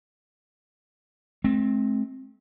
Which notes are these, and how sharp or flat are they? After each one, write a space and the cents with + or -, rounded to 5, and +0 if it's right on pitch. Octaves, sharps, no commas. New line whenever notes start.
A3 -45 C4 +15